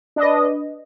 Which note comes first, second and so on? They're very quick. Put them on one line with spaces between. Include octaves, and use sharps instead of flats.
D4 D#5 B4